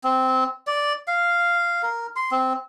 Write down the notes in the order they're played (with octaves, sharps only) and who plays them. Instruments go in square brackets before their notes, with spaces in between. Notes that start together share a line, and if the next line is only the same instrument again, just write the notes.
[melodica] C4
D5
F5
A#4
C6
C4